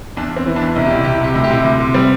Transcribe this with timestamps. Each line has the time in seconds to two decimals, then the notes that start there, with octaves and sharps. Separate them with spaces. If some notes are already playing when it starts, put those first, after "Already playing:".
0.17 E2 D4
0.31 E2
0.36 C4
0.46 E3
0.56 D4
0.62 E2
0.75 C2 E4
0.86 G4
0.91 C2 E4
1.04 C2 G4
1.14 E4
1.21 C3 G4
1.34 D2 E4
1.44 G4
1.50 C3 E4
1.64 D2
1.80 C3
1.94 G3 C4